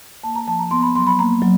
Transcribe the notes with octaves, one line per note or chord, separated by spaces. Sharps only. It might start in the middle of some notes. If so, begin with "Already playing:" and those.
A#3 A5
A#5
F3 A5
A#5
B3 C6
B5
F#3 C6
B5
A#3 A#5
F#3